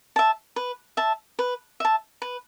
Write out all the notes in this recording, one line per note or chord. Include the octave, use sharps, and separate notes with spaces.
E5 A5
B4
E5 A5
B4
E5 A5
B4